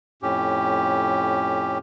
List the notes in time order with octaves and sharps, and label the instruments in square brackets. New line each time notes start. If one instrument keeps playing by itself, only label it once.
[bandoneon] F2 A2 C#4 G4